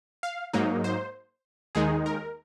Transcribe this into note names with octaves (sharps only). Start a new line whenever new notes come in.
F5
G#2 F#3 A#3 D#4
C5
D#2 D#3 G#3 D#4 G#4
A#4